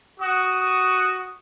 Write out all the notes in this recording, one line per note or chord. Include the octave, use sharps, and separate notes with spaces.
F#4 D#6